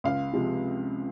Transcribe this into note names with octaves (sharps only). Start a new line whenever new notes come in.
C#2 F5
C3 F3 G#3